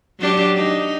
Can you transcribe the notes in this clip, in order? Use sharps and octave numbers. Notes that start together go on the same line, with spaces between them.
F#3 D4 G4
D#4